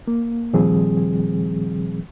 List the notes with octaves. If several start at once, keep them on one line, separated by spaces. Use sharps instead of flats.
A#3
A#2 D#3 F3 G3 C4 G#4